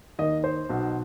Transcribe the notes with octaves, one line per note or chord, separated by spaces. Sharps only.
D#2 D#3 D#5
C5
B1 B2